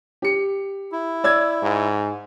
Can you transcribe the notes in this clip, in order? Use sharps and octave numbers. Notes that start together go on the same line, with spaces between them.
G4 C#7
E4
D5 E6 G#6
G#2